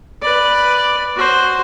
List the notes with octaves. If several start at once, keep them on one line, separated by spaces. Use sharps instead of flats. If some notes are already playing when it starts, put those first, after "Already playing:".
B4 D5
F#4 C5